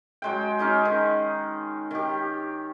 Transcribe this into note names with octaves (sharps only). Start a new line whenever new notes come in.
F#3 G#3 G5
C#4 D#4 G#4
D#3
D#3 G4